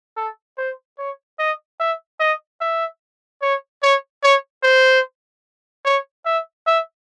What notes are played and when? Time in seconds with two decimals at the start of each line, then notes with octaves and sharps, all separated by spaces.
0.16 A4
0.58 C5
0.98 C#5
1.39 D#5
1.80 E5
2.20 D#5
2.60 E5
3.42 C#5
3.82 C#5
4.23 C#5
4.63 C5
5.85 C#5
6.25 E5
6.67 E5